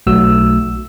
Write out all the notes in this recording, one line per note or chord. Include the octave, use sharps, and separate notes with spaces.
B1 A3 F#4 E6